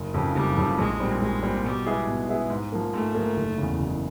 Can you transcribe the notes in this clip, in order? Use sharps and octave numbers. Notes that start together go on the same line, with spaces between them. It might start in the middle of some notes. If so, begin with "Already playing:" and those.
Already playing: F#1
F2 C#3 F3
F#1 G3
F2 C#3 F3
A#1 G#3
A#2 G3 C4
A#1 G#3
A#2 G3 C4
B2 G3
G#3 B3 E4 G#4
B2
G#3 B3 E4 G#4
G#2
F3 A#3
G#2 A3
F3 A#3
F#1
E2 C#3
F#1